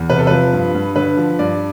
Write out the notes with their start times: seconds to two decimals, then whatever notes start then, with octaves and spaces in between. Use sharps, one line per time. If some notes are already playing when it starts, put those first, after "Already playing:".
Already playing: E2
0.10 C3 B4
0.19 A4
0.27 F3 B4
0.53 G2
0.75 G2
0.96 D3 B4
1.17 F3
1.39 G2 D5